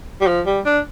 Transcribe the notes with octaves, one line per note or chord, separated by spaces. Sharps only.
G3
F3
G3
D4